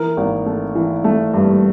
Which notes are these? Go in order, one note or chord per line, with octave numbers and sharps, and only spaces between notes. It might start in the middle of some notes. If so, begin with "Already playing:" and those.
Already playing: E3 A#4
G#1
A3
E3
A3
G2